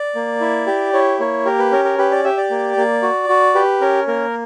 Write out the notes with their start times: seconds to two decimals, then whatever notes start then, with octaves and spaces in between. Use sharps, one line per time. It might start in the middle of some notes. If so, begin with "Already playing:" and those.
Already playing: D5
0.15 A#3
0.41 E4
0.67 G4
0.93 E4 C#5
1.20 A#3 C#5
1.45 G4 A#4
1.59 B4
1.72 C#4 A#4
1.85 A#4
1.98 G4 B4
2.11 D5
2.24 G4 E5
2.37 D5
2.50 A#3
2.77 A#3
3.03 F#4
3.29 F#4
3.55 G4 B4
3.81 C#4 A#4
4.08 A#3 A#4